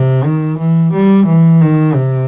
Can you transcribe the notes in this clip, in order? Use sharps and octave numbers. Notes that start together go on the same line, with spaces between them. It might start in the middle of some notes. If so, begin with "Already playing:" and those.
Already playing: C3
D#3
E3
G3
E3
D#3
C3